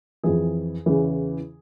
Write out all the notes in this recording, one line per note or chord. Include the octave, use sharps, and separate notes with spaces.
F2 E3 G#4
E2 C#3 E3